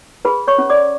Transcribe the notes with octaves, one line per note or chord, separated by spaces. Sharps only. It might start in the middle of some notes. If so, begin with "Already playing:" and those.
G#4 B4 B5
C#5 C#6
C#4
D5 D6